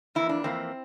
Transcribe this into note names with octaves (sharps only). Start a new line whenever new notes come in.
F2 E3 A#3 E4
D4
F2 E3 A#3 C4